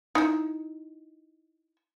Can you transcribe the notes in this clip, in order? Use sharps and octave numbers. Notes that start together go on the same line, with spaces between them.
D#4 E4